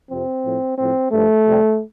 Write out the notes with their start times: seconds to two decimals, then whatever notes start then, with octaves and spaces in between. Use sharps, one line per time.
0.11 F2 C3 F3 C4
0.45 A2 F3
0.78 A2 F3 C4
1.12 G2 F3 A3
1.45 F2 C3 G3